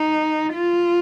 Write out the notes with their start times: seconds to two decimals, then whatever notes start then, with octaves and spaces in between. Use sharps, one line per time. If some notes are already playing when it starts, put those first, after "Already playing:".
Already playing: D#4
0.53 F4